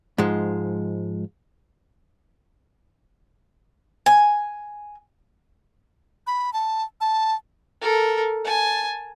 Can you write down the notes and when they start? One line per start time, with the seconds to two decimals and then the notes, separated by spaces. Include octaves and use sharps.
0.18 G#2 F3 G#3
4.06 G#5
6.27 B5
6.53 A5
7.01 A5
7.81 A4 A#4
8.44 G#5 A5